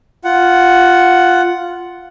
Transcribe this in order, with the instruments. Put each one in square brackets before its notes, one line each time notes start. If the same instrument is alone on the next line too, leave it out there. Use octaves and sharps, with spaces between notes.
[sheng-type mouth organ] F4 F#5